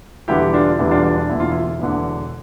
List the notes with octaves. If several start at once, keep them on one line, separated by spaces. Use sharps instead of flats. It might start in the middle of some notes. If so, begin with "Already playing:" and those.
E1 E2 D3 G3 B3 E4 G4
D4 F4
E1 E2 D3 G3 B3 E4
D4 F4
D4
D4
E1 E2 D3 E4
F4
E4
E1 E2 D3